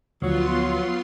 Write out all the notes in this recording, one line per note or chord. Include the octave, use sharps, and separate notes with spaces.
D2 F3 F#3 B3 F4 C6